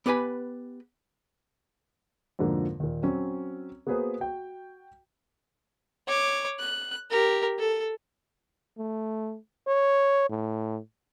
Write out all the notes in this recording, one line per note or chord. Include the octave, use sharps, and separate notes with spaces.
B3 G4 B4 G#5 B5
F2 G#2 B2 D3 F3 A#3
D#2 A#2
F#3 C4 C#4
A#3 B3 F#4 G#4 B4 C5
F#4 G5
C#5 D6
F#6
G4 A#4
A4
A3
C#5
A2